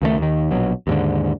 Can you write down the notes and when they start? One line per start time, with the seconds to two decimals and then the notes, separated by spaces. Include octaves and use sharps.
0.01 C#2 D#3 F3 A3
0.18 D#2 D#3
0.51 A#1 B2 F#3
0.87 D#2 G#2 D3